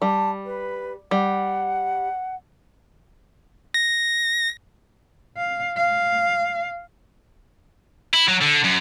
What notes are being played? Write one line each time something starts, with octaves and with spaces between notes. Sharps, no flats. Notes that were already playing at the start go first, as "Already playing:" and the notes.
G3 A5
B4
G3 F#5
A#6
F5
F5
E4
F#3
D3
F#2